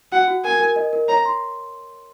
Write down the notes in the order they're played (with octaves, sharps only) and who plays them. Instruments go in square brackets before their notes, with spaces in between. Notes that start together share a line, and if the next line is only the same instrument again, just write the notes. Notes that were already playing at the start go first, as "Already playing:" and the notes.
[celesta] F#4 [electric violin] F#5
[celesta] F#4
[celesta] A#4 [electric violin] G#5
[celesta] A#4
D#5
A#4
[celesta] C#5 [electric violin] A#5
[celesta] C6